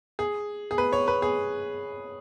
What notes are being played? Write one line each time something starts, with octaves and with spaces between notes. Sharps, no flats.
G#4
G#4
B4
C#5
B4
G#4